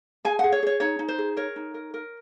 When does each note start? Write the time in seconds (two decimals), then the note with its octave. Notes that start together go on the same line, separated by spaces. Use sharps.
0.25 G#4 G#5
0.39 G#4 F#5
0.52 C#5
0.63 G#4 C#5
0.80 D#4 C#5
0.99 D#4
1.08 C5
1.18 G#4
1.37 A#4 C#5
1.56 D#4
1.74 A#4
1.94 A#4